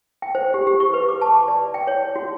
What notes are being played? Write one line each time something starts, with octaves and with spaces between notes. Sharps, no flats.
G5
C5
G4
G4
C#6
B4
D6
A5
D5
G5
C#5
F#4